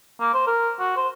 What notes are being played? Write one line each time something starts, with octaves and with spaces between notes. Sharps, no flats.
A#3
C5
A#4
F#4
C5